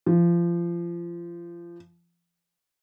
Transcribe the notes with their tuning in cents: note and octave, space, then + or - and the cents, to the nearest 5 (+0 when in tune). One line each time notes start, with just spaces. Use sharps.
F3 -25